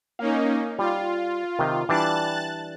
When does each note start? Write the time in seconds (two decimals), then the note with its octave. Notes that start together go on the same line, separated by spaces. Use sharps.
0.19 A#3 C#4 D#4 F5
0.79 G3 F4
1.59 C3 D#3
1.89 E3 G3 D4 A5 F#6 A6